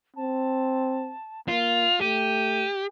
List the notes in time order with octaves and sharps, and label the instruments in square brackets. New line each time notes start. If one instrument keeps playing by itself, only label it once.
[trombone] C4 [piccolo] A5
[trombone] A#3 [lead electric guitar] F4 [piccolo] F7
[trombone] A3 [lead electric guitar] G4 [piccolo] D#7